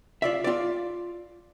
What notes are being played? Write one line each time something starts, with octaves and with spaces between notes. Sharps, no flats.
F4 D5 E5
F4 D5